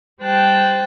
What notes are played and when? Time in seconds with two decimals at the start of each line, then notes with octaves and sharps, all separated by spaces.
0.21 G3 C5 G5 A5 F#6